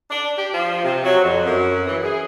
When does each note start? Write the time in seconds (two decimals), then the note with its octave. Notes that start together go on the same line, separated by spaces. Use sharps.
0.11 D4
0.38 G4
0.53 F3
0.84 C3
1.04 F#3
1.24 F2
1.46 F#2
1.87 E3
2.03 G#4